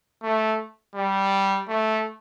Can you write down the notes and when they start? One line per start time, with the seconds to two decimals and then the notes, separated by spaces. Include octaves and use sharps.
0.23 A3
0.95 G3
1.69 A3